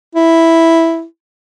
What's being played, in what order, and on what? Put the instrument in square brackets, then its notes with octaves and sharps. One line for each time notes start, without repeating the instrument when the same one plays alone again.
[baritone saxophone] E4